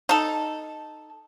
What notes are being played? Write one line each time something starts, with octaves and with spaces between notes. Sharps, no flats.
D#4 A4